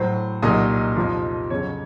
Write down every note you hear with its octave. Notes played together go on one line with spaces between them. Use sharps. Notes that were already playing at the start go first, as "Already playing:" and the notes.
Already playing: A2 F#3 C5
C2 A#2 F#3 D#4 D#5
F2 C3 F3
F2 C#3 F#3 C#5